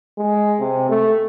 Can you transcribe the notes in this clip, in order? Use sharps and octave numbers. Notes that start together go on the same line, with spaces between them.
G#3
C3
A3